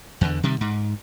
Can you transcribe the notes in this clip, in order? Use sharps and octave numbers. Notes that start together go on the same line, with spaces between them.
E2 D3
C3 D#3 G3
G#2